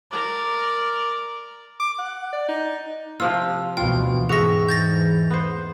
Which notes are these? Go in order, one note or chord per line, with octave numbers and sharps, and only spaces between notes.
A#4 D5
D6
F#5
D5
D#4
C3 F3 F4 E6
D2 B2 E3 F4 G5
E2 G#2 E3 F#4 G#4 A4 E5 A#6
G6 A6 A#6
B3 C5